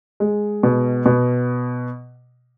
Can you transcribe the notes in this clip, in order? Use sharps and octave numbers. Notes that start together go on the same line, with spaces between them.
G#3
B2
B2